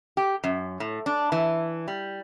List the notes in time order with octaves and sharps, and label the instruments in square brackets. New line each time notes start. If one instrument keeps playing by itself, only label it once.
[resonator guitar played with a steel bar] G4
F#2
A2
D4
E3
G3